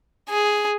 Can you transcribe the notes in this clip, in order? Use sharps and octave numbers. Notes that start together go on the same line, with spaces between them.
G#4